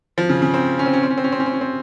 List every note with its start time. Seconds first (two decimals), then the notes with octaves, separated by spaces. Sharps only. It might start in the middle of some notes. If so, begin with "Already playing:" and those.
0.18 F3
0.29 C#3
0.42 C#3
0.54 C4
0.79 C#4
0.86 C4
0.93 C#4
1.03 C4
1.10 C#4
1.18 C4
1.24 C#4
1.32 C4
1.40 C#4
1.46 C4
1.54 C#4
1.61 C4